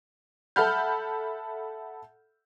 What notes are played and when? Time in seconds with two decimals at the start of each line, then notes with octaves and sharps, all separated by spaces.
0.56 A4 E5 F#5 B5 F6 G6